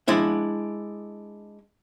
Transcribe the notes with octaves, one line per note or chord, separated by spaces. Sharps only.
G#3 D4 E4 E5